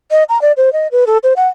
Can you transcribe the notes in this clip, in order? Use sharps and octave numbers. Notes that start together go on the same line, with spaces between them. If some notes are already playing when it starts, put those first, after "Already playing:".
D#5
A#5
D5
C5
D#5
B4
A4
C5
F#5